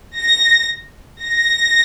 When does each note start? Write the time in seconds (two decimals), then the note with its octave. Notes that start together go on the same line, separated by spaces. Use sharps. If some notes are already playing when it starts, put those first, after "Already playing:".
0.16 A#6
1.22 A#6